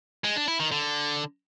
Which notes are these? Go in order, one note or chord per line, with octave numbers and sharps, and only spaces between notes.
G#3
D4
E4
D#3
D3